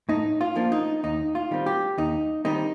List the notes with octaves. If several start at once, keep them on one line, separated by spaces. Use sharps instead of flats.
A2 D#4
F4
F3 A#3 D4
D#4
D#2 D#4
F4
D#3 G3 C4
G4
D#2 D#4
D#3 G3 C4 D#4